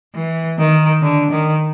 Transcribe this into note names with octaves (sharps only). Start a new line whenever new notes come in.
E3
D#3
D3
D#3